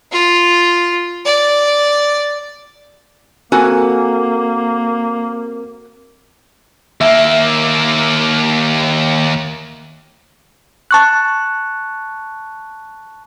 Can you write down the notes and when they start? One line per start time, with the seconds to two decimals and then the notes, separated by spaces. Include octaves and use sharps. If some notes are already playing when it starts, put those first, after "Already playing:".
0.12 F4
1.25 D5
3.52 A#3 C4 F#4 A4 A#4 G#5
7.01 D#2 A#3 E5
10.91 A5 C#6 F#6